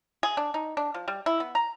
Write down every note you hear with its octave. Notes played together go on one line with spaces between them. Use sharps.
G#4
D4
D#4
D4
F3
G3
E4
B3
A#5